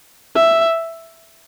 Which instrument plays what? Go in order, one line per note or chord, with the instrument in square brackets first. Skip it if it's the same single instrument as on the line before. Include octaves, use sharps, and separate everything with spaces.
[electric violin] E5